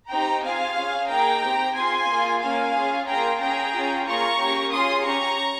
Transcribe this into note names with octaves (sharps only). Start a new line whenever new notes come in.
C4 D#4 G4 G5 A#5
C4 F4 G#4 F5 G#5
C#4 G#4
A#3 D#4 G#4 G5 A#5
C4 G4
C4 F4 G#4 G#5 C6
A#3 F4 G#4
A#3 C#4 F4 F5 G#5
C#4 F4 G#4
A#3 F4 G#4 G5 A#5
C#4 G#4 G5 A#5
C#4 F4 G#4
A#3 F4 G#4 A#5 C#6
A#3 C#4 G4
C#4 F4 G#4 C6 D#6
C#4 G4 A#5 C#6